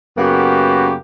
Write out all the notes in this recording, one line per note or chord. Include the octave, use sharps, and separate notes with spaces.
F#2 C#3 A#3 B3 F#4 G4